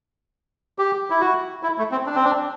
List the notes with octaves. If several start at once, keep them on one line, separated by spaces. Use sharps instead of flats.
G4
E4
F#4
E4
A3
C4
D4
C4
D4